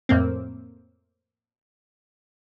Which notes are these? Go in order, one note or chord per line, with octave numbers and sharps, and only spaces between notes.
F2 A2 A#3 C4